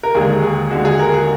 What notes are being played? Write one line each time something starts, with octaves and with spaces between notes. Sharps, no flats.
A#4
D#2 D3 G#3 G#4
G#4
D#2 D3 G#3 F#4
G#4
A#4
G#4